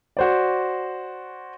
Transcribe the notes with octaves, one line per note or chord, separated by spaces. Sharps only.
F#4 C5 D5